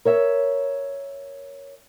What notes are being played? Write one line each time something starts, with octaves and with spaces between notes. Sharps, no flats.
A#4 C#5 E5